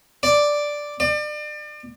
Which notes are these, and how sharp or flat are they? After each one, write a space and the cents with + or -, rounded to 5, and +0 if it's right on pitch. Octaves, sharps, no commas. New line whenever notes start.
D5 +0
D5 +35